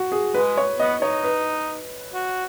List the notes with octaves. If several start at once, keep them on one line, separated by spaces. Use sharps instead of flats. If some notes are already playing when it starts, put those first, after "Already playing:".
Already playing: F#4
G#4
G#3 B4
C#5
B3 D#5
D#4 C#5
B4
F#4